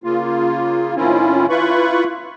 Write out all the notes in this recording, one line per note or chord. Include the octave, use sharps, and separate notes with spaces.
C#3 A#3 F4
A2 D#3 C4 C#4 E4 F4
E4 F4 B4 B5 C#6